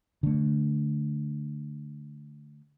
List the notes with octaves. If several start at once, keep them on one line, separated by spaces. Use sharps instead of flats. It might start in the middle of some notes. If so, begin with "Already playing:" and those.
D3 A3